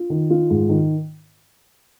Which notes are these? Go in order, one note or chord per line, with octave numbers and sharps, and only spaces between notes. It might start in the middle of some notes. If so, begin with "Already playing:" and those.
Already playing: F4
D#3
F4
G#2
D#3